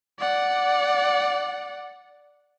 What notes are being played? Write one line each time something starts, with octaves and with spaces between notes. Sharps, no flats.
D5 F#5